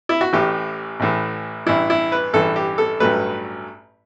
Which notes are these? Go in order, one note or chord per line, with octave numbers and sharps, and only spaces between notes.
E4
F#4
A1 A2 E3 G4
A1 A2 E3
A1 G2 E3 E4
E4
B4
A1 G2 E3 A4
G4
A4
A1 G2 F#3 A3 B4